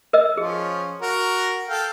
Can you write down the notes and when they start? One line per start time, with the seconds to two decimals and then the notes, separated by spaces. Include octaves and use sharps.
0.13 A#4 D#5 E6
0.37 F3 C#4 F4 G#4
1.02 F#4 A#4
1.69 A4 F5 G5